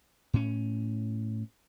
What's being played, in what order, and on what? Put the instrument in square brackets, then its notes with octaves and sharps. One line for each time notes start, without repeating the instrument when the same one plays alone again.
[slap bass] A2 C#4